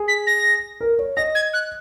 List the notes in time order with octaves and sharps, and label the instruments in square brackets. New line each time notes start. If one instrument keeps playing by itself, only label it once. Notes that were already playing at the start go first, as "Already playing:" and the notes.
Already playing: [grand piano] G#4
[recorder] B6
A#6
[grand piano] A#4
C#5
[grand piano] D#5 [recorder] A#6
[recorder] G#6
F#6